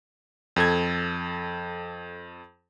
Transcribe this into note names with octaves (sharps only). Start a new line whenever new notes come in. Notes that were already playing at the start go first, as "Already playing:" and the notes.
F2 A4 G#6